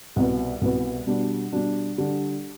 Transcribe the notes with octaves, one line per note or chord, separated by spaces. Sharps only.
C2 B2 B3
C2 B2 B3
B2 G3 D4
B2 G3 D4
D3 G3 D4 G4